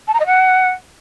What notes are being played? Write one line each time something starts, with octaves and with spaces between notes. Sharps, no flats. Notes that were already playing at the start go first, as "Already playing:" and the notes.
A5
A#5
D#5
F#5